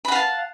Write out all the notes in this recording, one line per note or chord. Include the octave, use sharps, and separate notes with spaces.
F5 F#5 A5 B5